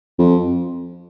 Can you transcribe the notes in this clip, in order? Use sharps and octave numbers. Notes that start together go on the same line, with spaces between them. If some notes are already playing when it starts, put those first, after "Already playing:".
F2